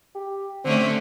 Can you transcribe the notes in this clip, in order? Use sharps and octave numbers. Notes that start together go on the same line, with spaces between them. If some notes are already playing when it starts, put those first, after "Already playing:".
G4
D3 A3 C4 C#4